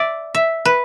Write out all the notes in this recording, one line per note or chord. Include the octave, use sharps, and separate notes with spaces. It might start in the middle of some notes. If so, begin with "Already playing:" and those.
Already playing: D5 E5
E5
B4